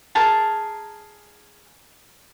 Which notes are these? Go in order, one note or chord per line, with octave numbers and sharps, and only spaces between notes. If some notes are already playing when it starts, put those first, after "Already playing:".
G#4 A#4 A5